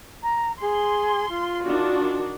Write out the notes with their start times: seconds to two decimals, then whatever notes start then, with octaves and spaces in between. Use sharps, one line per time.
0.22 A#5
0.60 G#4 C6
1.29 F4
1.65 D#3 D4 F#4